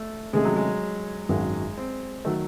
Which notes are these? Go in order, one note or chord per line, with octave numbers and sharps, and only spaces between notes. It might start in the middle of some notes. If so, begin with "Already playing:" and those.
Already playing: A3
C3 D#3 G#3 A3 C#4 G#4
F#3
G#3
G#1 F#2 D#3 F#3 G#3
C4
D#3 F#3 A3